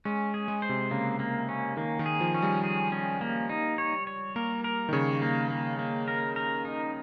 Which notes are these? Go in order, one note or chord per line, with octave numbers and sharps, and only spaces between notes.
G#3 C#4
G#4
G#3
C5
C3
C#3 A#3
A#3
C#4
D#3 A#3
D#3
G#4
F3
C#4
G3
G#4
C#4
A#3
D#4
C#5
C#5
A#3 A#4
A#4
D#3
C#3 C#5
A#3
A#3
A#3
A#4
A#4
D#4